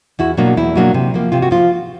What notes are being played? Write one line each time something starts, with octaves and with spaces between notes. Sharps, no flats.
E2 E4 F#4
B2 F#3 A#3 D4
E2 E4
B2 F#3 A#3 D4
C3
F3 A#3
C3 F4
F#4
F3 F4